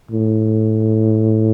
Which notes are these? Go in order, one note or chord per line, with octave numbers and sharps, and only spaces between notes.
A2